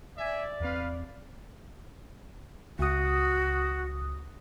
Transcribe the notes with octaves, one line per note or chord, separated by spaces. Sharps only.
D5 E5 G#5
E2 C4 B4 F5
C#2 F#4 D#6